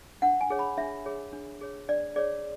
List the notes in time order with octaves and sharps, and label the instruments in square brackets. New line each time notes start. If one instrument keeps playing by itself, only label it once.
[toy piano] D4 F#5
G#5
G#4 C#5
B5
D4 E5
G#4 C#5
D4
G#4 C#5
D4 D5
G#4 C#5 D5